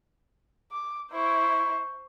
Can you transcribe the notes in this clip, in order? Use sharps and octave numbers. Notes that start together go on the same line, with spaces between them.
D6
E4 C5 C#6